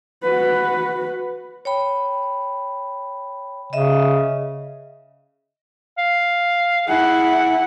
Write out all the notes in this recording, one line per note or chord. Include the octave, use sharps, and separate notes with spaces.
F#4 B4
C#5 G5 B5
C#3 D#5 E5
F5
E4 G#4 F#5